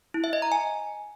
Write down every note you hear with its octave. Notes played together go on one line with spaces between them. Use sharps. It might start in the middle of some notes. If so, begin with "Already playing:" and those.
E4
E5
D#5
A#5
G#5